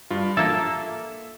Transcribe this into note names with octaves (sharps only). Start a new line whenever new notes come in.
G2 F4
A#3 A4 E5